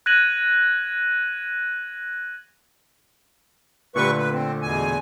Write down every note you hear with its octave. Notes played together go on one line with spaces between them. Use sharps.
F#6 G#6 A#6 D#7 F#7
A#2 D3 G3 A3 B4 C#6
B4
C4
E2 B2 G#5